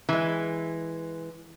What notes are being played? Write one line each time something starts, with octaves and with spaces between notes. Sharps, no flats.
E3 G#3